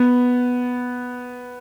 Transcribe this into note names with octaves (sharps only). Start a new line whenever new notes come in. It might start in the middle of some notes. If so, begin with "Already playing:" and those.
Already playing: B3